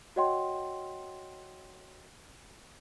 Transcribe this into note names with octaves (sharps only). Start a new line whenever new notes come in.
F#4 C#5 D#5 F#5 G5 C6